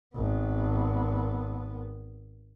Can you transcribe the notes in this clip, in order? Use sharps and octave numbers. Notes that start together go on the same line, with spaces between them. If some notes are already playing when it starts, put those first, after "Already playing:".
G#1 B3